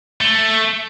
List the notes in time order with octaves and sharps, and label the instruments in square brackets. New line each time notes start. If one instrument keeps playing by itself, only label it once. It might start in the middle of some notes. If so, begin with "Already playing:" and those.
[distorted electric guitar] A3